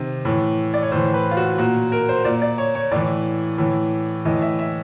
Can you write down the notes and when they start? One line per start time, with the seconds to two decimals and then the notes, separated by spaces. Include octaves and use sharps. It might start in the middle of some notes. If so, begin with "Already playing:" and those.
Already playing: C3 D#3
0.25 A2 E3
0.74 D5
0.83 C#5
0.92 A2 E3 C5
1.14 B4
1.31 F4
1.37 F#4
1.58 A#2 F#4
1.92 A#4
2.09 C5
2.25 A#2 D5
2.42 D5
2.58 C#5
2.75 C#5
2.91 A2 E3 D5
3.58 A2 E3
4.25 A2 E3 D#5
4.42 E5
4.59 E5